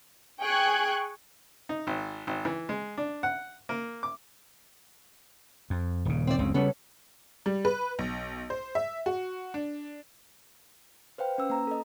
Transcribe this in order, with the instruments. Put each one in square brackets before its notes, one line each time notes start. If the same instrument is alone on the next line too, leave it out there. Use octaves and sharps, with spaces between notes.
[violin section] G#4 G5 G#5 C#6 F#6 G#6
[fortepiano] D#4
G#1
G#1
E3
G#3
D4
F#5
A#3
D6
[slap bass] F2
D#1 C#3
[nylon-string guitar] C4 D5
[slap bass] F#1 C#2 C#3 [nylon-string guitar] C4
[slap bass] C#3 G3 [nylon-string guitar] B3 C#4 A4
[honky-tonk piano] G3
B4
B1
C5
E5
F#4
D4
[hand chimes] B4 C5 F5 G5
C#4 B4 E6
A#3 A#5
A4 D#5